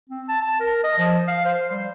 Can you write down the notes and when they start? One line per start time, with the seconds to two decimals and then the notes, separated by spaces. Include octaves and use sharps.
0.10 C4
0.28 A5
0.42 A5
0.60 A#4
0.84 D#5
0.98 F3
1.28 F5
1.46 C5
1.71 G3